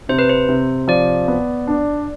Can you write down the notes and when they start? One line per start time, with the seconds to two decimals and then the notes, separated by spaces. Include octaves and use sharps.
0.09 C3 C5
0.19 B4
0.30 C5
0.49 C3
0.88 F3 D5
1.28 B3
1.67 D4